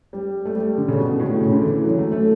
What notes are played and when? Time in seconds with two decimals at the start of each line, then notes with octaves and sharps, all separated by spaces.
0.13 G3
0.45 A3
0.55 G3
0.78 D3
0.88 C#3
0.98 B2
1.20 A2
1.41 C#3
1.52 D3
1.62 E3
1.84 F#3
1.98 A3
2.12 A3